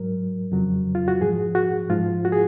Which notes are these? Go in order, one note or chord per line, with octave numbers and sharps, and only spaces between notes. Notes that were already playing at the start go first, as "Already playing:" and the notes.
Already playing: G#2 F#3 A#4
F2 C#3 F#3
F4
F#4
G#2 F3 G#4
F#4
G#2 F3 F4
F#4
G#4